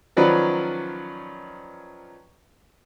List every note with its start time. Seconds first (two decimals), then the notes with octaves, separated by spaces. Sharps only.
0.17 D#3 F3 F#3 C#4 B4 D5